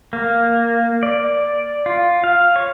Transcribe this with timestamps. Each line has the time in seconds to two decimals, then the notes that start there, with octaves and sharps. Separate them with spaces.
0.13 A#3
1.03 D5
1.86 F4
2.24 F5
2.56 C#5